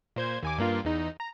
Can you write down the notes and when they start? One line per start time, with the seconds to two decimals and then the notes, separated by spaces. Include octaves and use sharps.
0.16 A#2 C5 G#6
0.43 D#2 G#5 D6
0.58 G2 A#3 F4
0.85 E2 D#4
1.20 A#5